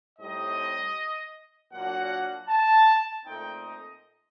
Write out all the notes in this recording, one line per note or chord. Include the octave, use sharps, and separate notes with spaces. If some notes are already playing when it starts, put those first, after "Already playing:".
A2 G3 C4 D#4 D#5
A#2 F#3 A#3 D4 F#5
A5
A#2 A3 C4 D#4 G5
D#5